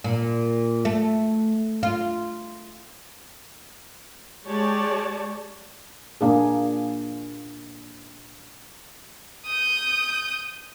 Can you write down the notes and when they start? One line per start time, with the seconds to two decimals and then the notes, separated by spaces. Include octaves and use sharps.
0.04 A#2
0.85 A3
1.83 F4
4.45 G#3 G4 C#5 D5 A5
6.21 A#2 A#3 D4 G#4
9.46 D#6 G6